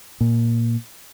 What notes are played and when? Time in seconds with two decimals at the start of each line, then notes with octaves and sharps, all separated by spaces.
0.21 A#2